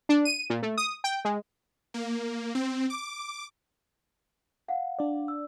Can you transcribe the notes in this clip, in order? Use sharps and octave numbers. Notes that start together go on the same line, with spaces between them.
D4
D#7
A#2
A3
D#6
G5
G#3
A#3
C4
D6
F5 F#5
D4 D5
E6